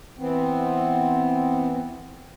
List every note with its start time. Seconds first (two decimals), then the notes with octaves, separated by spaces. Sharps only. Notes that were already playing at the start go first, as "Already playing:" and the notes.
0.19 E3 B3 C4